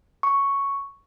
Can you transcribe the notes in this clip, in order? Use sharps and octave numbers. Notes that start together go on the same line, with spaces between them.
C#6